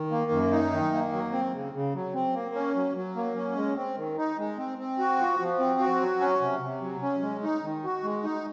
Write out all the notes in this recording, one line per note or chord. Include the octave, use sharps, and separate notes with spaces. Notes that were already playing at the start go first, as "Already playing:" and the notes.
Already playing: D#3
A#3
F#2
D#4
D#3
A#3
F#3
C4
C#3
C#3
F#3
C4
A#3
C#4
F#3
F#3
A#3
C#4
G#3
C4
D#3
D#4
G#3
C4
C4
F#4
F3
F3
C4
F#4
F#3
C#4
C3
C3
F#3
C#4
G#3
D#4
D#3
F#4
G#3
D#4